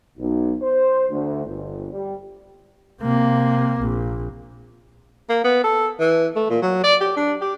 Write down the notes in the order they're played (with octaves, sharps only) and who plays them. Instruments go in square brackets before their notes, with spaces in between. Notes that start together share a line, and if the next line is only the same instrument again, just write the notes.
[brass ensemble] B1
C5
D2
G1
G3
[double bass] C3 A#3
A#1
[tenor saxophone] A#3
B3
A4
E3
A3
A#2
F#3
D5
G4
D4
G4